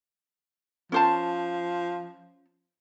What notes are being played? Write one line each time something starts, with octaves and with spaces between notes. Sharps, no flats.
F3 C#4 C5 A5